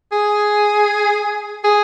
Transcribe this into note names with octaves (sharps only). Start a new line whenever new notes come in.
G#4
G#4